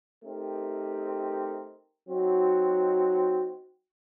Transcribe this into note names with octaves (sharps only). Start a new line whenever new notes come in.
A3 C4 D#4 G4 A#4
F#3 C4 D#4 F#4